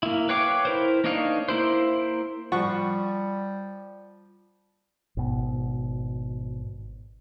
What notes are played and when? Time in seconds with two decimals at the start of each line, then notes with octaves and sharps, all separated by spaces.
0.03 A#3 E4
0.29 B4 C#5 F5 G5 D6
0.65 E4 A#4 C5
1.04 A#3 D4 D#4 C#5 F5
1.48 A#3 E4 C5
2.52 F3 G3 F#5 C#6
5.17 G#1 B2